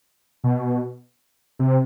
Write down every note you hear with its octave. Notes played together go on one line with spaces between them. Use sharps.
B2
C3